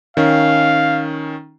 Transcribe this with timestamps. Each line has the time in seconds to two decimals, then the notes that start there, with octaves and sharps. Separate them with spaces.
0.17 D#3 C#4 F5